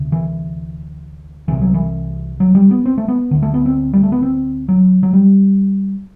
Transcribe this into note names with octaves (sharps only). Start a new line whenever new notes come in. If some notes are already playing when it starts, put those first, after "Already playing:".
Already playing: D2 C3
E3
C2 C3 E3
F#3
E3
F#3
G3
B3
C4
A3
B3
D2 D3
A3
B3
C4
G3
A3
B3
C4
F#3
F#3
G3